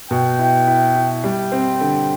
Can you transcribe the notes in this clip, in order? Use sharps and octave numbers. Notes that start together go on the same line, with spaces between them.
B2 G5
E4
E4
E4
G3 G5
C4
D3